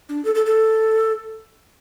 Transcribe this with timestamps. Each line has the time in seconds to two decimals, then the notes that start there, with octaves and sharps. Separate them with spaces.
0.09 D4
0.25 A4
0.35 A4
0.46 A4